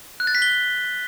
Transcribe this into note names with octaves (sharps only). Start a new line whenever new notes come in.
F#6
A6
B6
G7